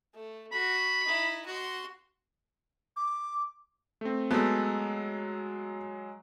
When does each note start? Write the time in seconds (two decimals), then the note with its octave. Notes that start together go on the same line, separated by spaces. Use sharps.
0.14 A3
0.52 F#4 B5
1.04 D#4 E4
1.46 F#4 C6
2.96 D6
4.01 A3 C4
4.30 F#3 G#3 A3 B3